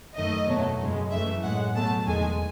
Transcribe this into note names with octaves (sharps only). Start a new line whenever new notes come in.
F#2 D#3 A3 D#5
E2 B2 F#3 A3
F#2 C#3 G#3
F#2 E3 A3 E5
A2 G#3 F#5
B2 F#3 A3 A5
E2 D#3 G#3 G#5